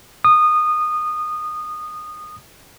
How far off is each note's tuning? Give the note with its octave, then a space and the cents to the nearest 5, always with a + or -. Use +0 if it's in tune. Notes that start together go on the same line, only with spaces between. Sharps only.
D#6 -20